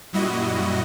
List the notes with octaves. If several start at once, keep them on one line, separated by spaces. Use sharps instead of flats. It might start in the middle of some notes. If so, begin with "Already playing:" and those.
F#2 A#2 G3 E4 F#4 D#5